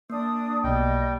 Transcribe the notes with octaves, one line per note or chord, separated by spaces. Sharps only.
A#3 D4 D#6
B1 B2 G3 D#5 G5